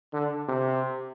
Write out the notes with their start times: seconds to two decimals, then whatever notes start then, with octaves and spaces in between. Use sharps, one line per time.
0.13 D3
0.48 C3